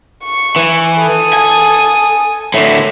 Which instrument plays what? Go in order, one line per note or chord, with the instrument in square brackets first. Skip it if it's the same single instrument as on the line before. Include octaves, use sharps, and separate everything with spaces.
[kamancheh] C#6
[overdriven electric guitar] E3
[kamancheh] A4 D#6
[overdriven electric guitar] G#5
[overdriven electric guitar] A2 D3 [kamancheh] E5